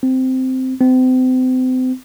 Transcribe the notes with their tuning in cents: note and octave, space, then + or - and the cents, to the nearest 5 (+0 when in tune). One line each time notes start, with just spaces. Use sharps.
C4 -10
C4 -35